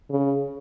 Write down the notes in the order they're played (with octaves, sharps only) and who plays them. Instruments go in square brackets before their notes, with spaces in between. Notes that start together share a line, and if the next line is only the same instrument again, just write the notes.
[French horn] C#3